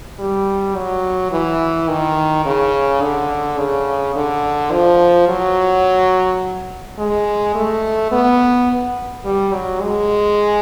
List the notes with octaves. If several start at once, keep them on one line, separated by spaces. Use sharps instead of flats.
G3
F#3
E3
D#3
C#3
D3
C#3
D3
F3
F#3
G#3
A3
B3
G3
F#3
G#3